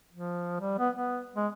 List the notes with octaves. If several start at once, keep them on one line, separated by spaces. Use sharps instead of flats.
F3
G3
B3
B3
G#3